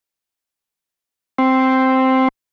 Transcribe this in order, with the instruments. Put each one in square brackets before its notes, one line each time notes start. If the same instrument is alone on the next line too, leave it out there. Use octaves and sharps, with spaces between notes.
[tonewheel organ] C4